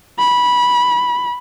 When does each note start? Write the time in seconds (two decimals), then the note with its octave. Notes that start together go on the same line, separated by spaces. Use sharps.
0.19 B5